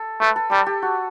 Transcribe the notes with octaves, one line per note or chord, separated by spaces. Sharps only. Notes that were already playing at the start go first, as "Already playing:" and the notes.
Already playing: A4
A3 B4
A4
G3 A4
G4
F#4